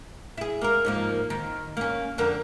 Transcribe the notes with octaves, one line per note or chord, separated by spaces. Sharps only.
E4 G#4
A#3 A#4
G#2 F3 A#3
D#3
A#3 C#4
F2 D3 A#4